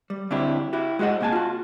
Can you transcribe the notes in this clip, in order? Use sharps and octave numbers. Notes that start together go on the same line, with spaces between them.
G3
D3 C4 D4 E4 G4
E4 F#4 G4
G#3 F#4 G#4 D#5 F#5
C3 A#3 G#5 A5
F4 F#4